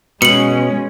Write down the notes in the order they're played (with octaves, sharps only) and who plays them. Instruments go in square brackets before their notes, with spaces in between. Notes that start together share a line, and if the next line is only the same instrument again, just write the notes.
[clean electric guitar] B2 [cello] G#3 C#4 [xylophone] C#7 F#7